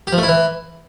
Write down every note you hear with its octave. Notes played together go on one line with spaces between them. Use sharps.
G4
F3
A3
E4
E3